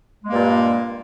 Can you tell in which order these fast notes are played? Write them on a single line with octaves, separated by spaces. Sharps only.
G#3 A#3 G2 A#2